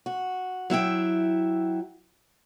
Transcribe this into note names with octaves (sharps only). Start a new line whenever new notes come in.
F#4
F#3 E4 E5 G5